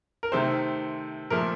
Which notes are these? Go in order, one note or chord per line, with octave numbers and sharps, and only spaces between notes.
A#4
C3 D#3 A3 C5
A#2 F3 A3 A#4